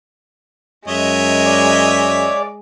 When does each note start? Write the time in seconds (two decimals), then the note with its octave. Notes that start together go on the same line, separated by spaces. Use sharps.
0.88 F#2 G#3 C#5 D#5 E5
1.46 D5